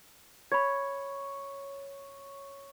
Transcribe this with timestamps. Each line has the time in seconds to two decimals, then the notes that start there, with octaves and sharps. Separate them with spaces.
0.52 C#5 B5 G#6